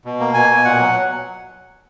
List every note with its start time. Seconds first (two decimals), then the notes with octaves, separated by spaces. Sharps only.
0.05 B2
0.20 A#3
0.34 B2 G#5
0.50 B2
0.64 A#2 F#5
0.79 F#3